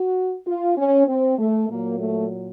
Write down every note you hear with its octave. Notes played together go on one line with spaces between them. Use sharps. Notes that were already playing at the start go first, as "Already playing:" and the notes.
Already playing: F#4
F4
C#4
C4
A3
A#2 F#3 A#3
A3